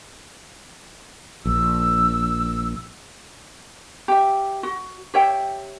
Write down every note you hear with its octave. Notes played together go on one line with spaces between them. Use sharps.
A#1 E6
G4 E5
F#4
G4 C#5 E5 G5